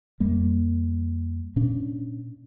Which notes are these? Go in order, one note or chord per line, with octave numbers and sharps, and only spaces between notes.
F2 G3 A#3
A#2 C#4 D4